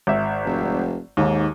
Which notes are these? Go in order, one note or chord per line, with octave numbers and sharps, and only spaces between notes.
G#1 E5
F1
D#2 G#2